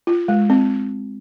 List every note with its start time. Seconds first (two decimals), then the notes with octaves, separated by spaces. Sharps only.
0.07 F4
0.28 G#3
0.50 C4